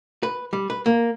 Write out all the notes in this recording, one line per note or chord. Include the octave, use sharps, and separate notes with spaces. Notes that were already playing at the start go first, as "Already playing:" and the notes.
B4
G3
B4
A#3